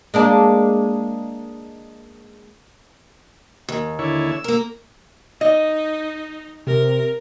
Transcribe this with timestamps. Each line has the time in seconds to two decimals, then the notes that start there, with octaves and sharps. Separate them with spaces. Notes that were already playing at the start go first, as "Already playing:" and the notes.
0.14 G#3 A#3 D4
3.69 D#2
3.99 D3 E4 C#5
4.32 E6
4.44 A#3 A#4
5.41 D#4 D#5
6.67 C3 A#4